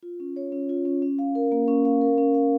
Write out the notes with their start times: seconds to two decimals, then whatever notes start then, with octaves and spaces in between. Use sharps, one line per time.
0.03 F4
0.20 C#4
0.36 C#5
0.52 C#4
0.69 F4
0.85 C#4
1.02 C#4
1.19 F5
1.35 A#4
1.52 A#3
1.68 C#4
1.85 F5
2.01 A#4
2.18 C#4
2.34 F5